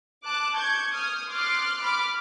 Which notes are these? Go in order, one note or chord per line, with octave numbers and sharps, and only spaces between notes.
A5 D6 F#6
C#6 G6 G#6
D#6 F6
C6 D6 F6 F#6 A6
B5 D6 F6